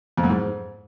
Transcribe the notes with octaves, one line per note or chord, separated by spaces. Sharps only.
F2
F#2
G#2